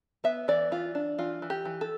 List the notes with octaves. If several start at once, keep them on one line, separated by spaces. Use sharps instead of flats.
B3 E5
E3 D5
E3 F4
D4
E3 F4
E3
G4
E3
A4